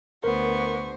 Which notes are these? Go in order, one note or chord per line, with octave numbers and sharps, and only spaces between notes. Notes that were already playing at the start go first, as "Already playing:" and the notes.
D2 B3 A#4 C5 C#6